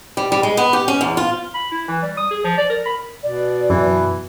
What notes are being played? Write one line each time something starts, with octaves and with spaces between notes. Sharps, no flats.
G3
G3
G#3
B3
G4
C#4
E2
F4
B5
E4
E3
G3
D#6
G#4
F3
D5
A#4
B5
B2 D5
F#2 E3